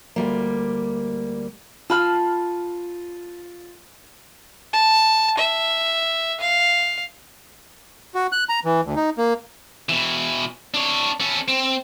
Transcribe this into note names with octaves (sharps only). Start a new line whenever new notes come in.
D2 G3 A#3
F4 A5 B5 F6
A5
E5
F5
F#4
F#6
A#5
E3
D2
D#4
A#3
B2 E3
D4 C#5
C#4 A4
C4